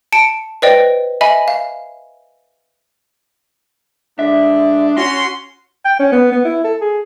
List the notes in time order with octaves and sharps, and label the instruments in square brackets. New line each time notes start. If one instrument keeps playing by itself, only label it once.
[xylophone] A5 C#7 D7
B4 C5 D5 D#5 G5
D#5 E5 G#5 B5
F5
[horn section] D3 G#3 D4 [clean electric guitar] E5
[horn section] C#4 C6 [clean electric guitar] F#4
[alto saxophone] G5
C#4
B3
B3
E4
A4
G#4